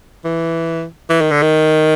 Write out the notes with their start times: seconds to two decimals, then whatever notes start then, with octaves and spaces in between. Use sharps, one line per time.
0.24 E3
1.09 E3
1.21 D#3
1.31 D3
1.42 D#3